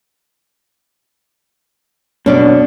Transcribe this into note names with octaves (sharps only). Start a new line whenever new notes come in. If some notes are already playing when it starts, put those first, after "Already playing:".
B2 C#4 D4